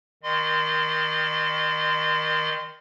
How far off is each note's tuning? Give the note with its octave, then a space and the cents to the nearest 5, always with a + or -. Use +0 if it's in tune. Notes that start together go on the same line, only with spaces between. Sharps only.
D#3 +15 D#5 -45 C6 -20